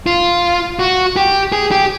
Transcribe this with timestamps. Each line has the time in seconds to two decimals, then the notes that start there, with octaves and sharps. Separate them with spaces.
0.06 F4
0.79 F#4
1.16 G4
1.52 G#4
1.71 G4